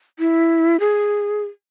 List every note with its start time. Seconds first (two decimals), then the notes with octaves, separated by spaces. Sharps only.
0.19 E4
0.80 G#4